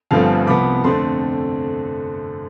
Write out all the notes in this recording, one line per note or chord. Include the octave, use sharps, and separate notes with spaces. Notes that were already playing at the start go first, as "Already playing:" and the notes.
G1 G2 F3 A3 C4 F5 A5
C2 C3 F3 B3 B5 D6
F2 D3 A3 C4 A5 C6